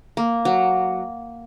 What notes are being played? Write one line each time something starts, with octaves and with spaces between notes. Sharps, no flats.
A#3
F#3